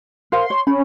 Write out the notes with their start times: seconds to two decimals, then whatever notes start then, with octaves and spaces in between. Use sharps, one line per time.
0.32 A#4 C5 F5 C6
0.50 C#5
0.67 C#4 B5